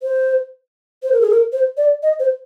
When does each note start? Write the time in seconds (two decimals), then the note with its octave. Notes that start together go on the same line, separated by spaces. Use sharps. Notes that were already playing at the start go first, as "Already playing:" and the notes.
0.03 C5
1.03 C5
1.12 A#4
1.21 G#4
1.30 A#4
1.52 C5
1.77 D5
2.03 D#5
2.20 C5